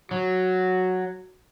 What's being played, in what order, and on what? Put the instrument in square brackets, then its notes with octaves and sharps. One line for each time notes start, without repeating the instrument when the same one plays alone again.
[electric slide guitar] F#3 [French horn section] F#4